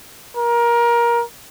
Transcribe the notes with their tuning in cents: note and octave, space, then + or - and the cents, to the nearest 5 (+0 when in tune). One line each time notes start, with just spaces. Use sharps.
A#4 +20